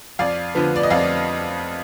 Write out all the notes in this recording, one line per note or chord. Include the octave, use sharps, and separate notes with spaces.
F2 D5 F5
D3 F3 B3
D5
D#5
F2 D5 F5